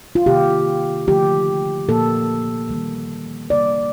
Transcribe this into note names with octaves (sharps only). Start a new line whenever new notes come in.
F4
C3 D#3 A#3 G4
D3 F3 A3 G4
A#2 F3 A#3 A4
D#3 G3 A#3
C3 G3 A#3 D5